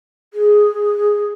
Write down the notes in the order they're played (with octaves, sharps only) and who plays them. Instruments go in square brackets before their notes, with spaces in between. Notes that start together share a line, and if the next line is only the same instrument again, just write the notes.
[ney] G#4